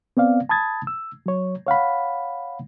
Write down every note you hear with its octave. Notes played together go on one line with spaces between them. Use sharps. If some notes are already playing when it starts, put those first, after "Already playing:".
B3 C4 D5 F5
A5 B5 D#6 G#6 A6
E6
F#3 C#5
C#5 F5 F#5 B5